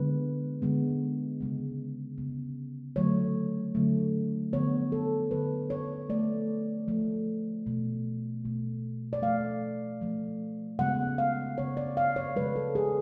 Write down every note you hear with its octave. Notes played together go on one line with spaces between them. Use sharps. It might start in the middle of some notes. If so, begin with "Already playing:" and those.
Already playing: D3 G#3 B3 B4
D3 G#3 B3
C#3 G#3 B3
C#3 G#3 B3
D3 F#3 A3 C#5
D3 F#3 A3
D3 F3 B3 C#5
A4
D3 F3 B3 B4
C#5
F3 A3 D5
F3 A3
B2 A3
B2 A3
D5
F3 A3 F5
F3 A3
C#3 G#3 B3 F#5
F5
C#3 G#3 B3 C#5
D5
F5
C#5
C#3 F3 G#3 B4
A4
G#4